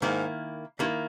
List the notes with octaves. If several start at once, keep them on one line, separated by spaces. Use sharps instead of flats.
G#2 D#3 A#3 E4
G2 D#3 A#3 E4